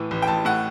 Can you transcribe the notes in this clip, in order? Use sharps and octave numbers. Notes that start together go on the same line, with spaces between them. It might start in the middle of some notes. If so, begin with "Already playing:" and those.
Already playing: A2 E3
A1
G5
A1 A5
A2 F#5